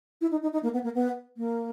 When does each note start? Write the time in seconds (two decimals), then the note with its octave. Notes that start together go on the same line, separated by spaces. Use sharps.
0.21 E4
0.31 D#4
0.42 D#4
0.53 D#4
0.63 A#3
0.73 B3
0.84 A#3
0.95 B3
1.37 A#3